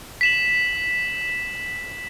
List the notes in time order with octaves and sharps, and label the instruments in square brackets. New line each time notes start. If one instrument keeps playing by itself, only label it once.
[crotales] B6 E7 F#7